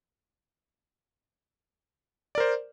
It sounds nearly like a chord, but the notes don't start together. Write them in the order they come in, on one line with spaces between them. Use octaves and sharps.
D5 A#4 C5